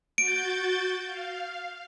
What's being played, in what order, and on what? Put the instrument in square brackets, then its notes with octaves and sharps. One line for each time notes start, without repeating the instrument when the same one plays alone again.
[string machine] F#4 G6 A6 [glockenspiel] D7
[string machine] F5